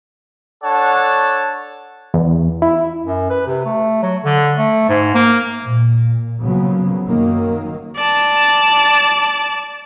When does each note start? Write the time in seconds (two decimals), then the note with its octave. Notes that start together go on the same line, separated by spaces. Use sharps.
0.64 D4 A4 C#5 F#5 A5
2.14 E2
2.62 E4
3.05 F#2
3.30 B4
3.47 C3
3.65 A3
4.03 F#3
4.25 D3
4.58 A3
4.89 G#2
5.15 A#3
5.64 A#2
6.43 C#3 F3 F#3 A#3 B3
7.08 F#2 D#3 F#3 A#3
7.96 D5 A5